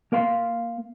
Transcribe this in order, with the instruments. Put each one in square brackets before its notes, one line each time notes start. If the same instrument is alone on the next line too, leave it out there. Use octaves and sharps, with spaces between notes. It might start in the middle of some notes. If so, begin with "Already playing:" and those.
[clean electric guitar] A#3 A#4 F5 C6